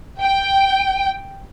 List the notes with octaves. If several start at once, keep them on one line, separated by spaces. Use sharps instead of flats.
G5